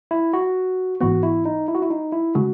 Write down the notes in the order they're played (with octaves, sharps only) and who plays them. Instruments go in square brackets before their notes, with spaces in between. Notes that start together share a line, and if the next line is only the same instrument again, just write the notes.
[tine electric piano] E4
F#4
[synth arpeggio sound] G#1 G#2 E3 B3 [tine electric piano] F#4
[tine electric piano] E4
D#4
E4
F#4
E4
D#4
E4
[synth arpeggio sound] C#3 G#3 [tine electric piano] F#4